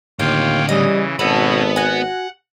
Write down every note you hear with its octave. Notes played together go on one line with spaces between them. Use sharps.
D#2 A2 D3 F4 C#5 F5 G5
C#3 E3 G3 D#5
G#1 B2 B3 C#4 F#4 A4 B5
F#4 F#5 G#5